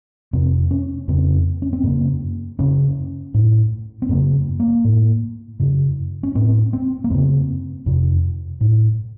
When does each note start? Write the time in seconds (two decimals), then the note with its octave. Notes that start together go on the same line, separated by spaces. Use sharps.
0.33 F2 C3 C4
0.71 C#4
1.08 F2 C#3 C4
1.62 C#4
1.73 C4
1.83 F#2 C#3 A#3
2.59 F#2 C#3 C#4
3.34 A2
4.02 C4
4.09 F#2 A#3
4.13 C#3
4.60 A#3
4.84 A2
5.60 F#2 C#3
6.23 C#4
6.35 A2 C4
6.73 C4
7.04 A#3
7.10 F#2 C#3 C4
7.86 F2 C3
8.61 A2